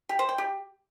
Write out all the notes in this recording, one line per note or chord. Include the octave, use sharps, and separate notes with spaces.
G4
C5
G5
G4